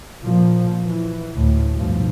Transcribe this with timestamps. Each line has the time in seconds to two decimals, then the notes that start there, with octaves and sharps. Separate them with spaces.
0.22 A#2 F3
0.85 E3
1.33 D2 A2
1.77 B1 G2 F3